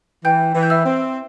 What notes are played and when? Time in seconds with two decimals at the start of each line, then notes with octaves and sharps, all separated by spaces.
0.25 E3 G5 G6
0.55 E3
0.63 G6
0.70 E5 E6
0.86 C4